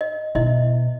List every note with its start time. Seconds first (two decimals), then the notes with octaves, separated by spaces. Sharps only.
0.01 D#5
0.35 B2 E4 D#5 E5